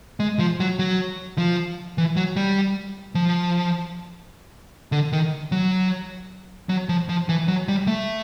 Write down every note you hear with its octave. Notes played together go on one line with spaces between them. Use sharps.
G#3
F3
F#3
F#3
F3
E3
F#3
G3
F3
D3
D#3
F#3
F#3
F3
F3
E3
F#3
G3
A3